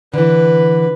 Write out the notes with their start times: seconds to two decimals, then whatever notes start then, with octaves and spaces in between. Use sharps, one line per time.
0.14 D3 E3 B4 B5